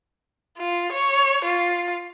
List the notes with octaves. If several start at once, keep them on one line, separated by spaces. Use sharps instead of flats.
F4
C#5
F4